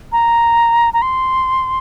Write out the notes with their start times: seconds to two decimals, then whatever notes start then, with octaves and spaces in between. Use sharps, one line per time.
0.12 A#5
0.93 A#5
1.02 C6